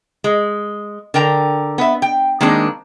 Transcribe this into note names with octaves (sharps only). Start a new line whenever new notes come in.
G#3
D3 A#4 G5 A#5
B3 E5
G5
D#3 G#3 A#3 C4 D4